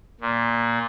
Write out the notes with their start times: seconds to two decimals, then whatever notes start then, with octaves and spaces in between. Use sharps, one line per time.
0.21 A#2